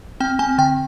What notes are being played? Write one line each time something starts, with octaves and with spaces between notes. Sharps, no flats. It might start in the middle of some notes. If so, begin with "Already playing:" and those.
C4 G5
C4 G#5
D3 G5